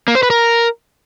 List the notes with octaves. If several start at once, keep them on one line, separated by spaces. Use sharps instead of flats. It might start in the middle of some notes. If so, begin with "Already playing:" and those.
A#3
C5
B4
A#4